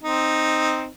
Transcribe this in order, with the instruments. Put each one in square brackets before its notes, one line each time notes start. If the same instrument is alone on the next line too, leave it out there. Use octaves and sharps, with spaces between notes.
[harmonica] C4 D#4